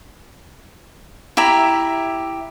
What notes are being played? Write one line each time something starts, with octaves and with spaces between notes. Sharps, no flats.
E4 G4 E5 A#5